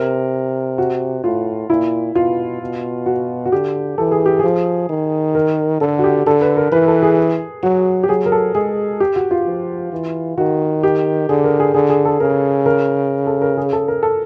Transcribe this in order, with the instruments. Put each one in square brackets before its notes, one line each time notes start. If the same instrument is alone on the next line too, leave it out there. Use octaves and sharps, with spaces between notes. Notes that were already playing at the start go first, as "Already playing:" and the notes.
Already playing: [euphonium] C3 [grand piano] A#4
[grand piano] F#4
[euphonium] A2 [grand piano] F4
[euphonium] A#2 [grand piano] E4
[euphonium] B2 [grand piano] F4
[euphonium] B2
[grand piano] F#4
F#4
[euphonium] D3 [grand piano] G4
[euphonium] E3 [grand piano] A4
[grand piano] G#4
G4
[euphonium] F3 [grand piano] G#4
[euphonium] D#3
[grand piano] A#4
[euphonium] D3 [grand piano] A4
[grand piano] F#4
G4
[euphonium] D3 [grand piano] A4
[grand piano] B4
A#4
[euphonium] E3 [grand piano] B4
[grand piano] A4
G#4
[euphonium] F#3 [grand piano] F#4
[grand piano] G4
[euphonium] F#3 [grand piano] G#4
[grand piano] A#4
A4
[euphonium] G#3 [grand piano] G#4
[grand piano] G4
F#4
F4
[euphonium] F3
E3
[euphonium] D#3 [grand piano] F#4
[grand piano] G4
[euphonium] D3 [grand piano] G#4
[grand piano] A#4
G#4
[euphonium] D3 [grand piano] G#4
[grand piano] G#4
A4
[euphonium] C#3 [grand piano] A#4
[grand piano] A#4
A4
A#4
G#4
A4
A#4
A4